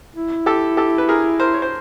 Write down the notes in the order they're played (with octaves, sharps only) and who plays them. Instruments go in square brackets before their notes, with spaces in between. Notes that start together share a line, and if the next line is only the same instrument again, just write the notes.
[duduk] E4
[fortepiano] G4 A4
G4 A4
B4
G#4 A#4
A#4 C5
C#5
C5